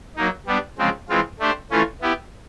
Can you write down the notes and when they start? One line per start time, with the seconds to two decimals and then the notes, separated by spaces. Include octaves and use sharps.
0.16 F#3 A#3 D#4
0.46 G3 B3 D4
0.78 C#3 F3 G#3 C4
1.09 E3 G#3 C4 F4
1.39 A3 D4 G4 C5
1.71 E3 A3 C#4 F4
2.02 B3 E4 G4